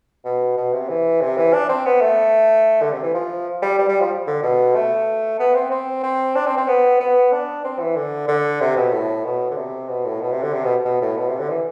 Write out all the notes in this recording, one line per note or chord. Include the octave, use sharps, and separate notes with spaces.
B2
B2
C3
E3
C3
E3
D4
C4
B3
A3
D3
C3
E3
F3
G3
G3
G3
F3
D3
B2
A3
B3
C4
C4
C4
D4
C4
C4
B3
B3
D4
C4
E3
D3
D3
C3
B2
A2
B2
D3
C3
B2
A2
B2
C3
D3
C3
B2
B2
A2
B2
C3
D3
E3